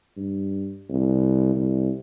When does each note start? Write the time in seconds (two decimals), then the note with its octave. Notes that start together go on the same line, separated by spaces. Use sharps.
0.17 G2
0.89 C2
1.56 C2